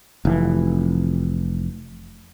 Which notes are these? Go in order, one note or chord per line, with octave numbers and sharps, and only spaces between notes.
F1 E3